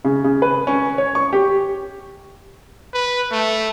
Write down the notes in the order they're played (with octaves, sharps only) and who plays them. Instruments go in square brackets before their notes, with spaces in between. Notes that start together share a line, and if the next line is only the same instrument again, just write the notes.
[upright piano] C#3
C#3
B4
C#4
C#5
C#6
G4
[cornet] B4
A3